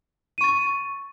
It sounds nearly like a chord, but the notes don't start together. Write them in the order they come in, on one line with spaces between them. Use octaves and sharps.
D#7 C#6 A6